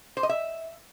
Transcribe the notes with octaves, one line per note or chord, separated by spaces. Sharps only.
C5
D#5
E5